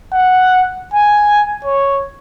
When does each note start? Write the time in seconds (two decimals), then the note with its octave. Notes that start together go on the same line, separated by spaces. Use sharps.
0.13 F#5
0.94 G#5
1.65 C#5